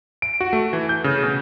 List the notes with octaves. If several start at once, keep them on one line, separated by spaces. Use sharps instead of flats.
D7
F#4
A3
E3
G6
C#3
B2